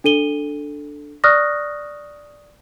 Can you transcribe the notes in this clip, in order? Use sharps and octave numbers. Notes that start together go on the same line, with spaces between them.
D4 A4 D#7 G7
D5 C#6 D#6 F6 F#6 A#6